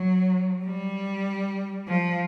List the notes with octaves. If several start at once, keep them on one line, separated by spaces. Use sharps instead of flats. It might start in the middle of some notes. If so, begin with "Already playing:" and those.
Already playing: F#3
G3
F3